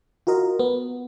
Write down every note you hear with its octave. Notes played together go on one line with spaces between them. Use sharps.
F4 F#4 A#4 D#5
B3